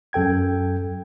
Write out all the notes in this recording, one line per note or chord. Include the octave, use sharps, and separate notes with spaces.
F#2 A4 G5 G#6